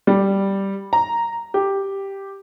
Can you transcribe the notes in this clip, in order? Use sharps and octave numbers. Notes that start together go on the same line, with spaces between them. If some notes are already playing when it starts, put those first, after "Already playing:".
G3
A#5
G4